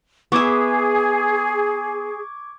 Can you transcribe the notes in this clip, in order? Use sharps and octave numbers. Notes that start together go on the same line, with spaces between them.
B3 G#4 E5 C#6 D6 G#6